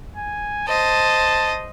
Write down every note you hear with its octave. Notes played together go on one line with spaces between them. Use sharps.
G#5
C5 D#5 A5